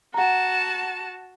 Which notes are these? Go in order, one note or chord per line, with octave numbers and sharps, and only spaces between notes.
F#4 F#5 A5 A#5